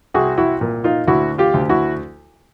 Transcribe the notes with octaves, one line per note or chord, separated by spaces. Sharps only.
C2 F#4 G#4
E4 F#4
A#2
D#4 F4
D2 E4 F#4
F4 G4
D2
E4 F#4